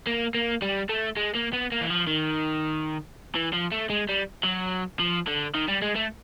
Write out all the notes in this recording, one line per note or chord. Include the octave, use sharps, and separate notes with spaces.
A#3
A#3
G3
A3
G#3
A#3
B3
A#3
E3
F3
D#3
E3
F3
A3
G#3
G3
F#3
F3
D3
D#3
G3
G#3
A3